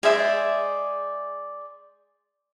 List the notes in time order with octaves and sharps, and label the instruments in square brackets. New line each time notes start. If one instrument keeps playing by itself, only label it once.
[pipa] G#3 E5 [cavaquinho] G#4 C5 D5